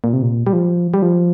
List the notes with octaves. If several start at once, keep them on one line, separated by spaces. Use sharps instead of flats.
A#2
C3
A#2
G3
F3
G3
F3